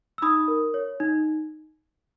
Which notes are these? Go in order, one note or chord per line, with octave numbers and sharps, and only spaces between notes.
E6
D#4 B5 D#6
A#4
C#5
D#4